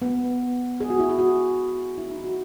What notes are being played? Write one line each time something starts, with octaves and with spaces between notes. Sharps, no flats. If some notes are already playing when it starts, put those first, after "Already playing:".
B3
G#4
F#4
E4
G#4
F#4
E4
D#4
F#4